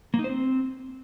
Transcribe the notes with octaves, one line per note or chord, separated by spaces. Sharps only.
A#3
D#4
C5
C4